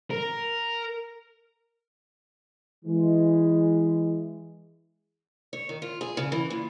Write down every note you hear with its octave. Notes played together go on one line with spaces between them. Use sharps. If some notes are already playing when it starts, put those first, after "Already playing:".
A#4
E3 G#3
C#5
D#3
F4
G#4
C#3
E3
A#2